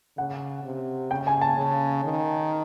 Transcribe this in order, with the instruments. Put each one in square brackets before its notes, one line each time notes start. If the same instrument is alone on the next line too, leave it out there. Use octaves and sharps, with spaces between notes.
[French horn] C#3 [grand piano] F#5
[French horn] C3
[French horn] C#3 [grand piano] G5
[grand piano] G#5
A5
[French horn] C#3
D#3